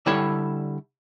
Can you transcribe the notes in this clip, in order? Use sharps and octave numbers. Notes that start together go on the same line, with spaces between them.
D3 G3 E4 A4 C#5